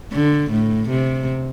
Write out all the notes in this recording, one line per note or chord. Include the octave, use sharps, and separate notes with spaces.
D3
A2
C3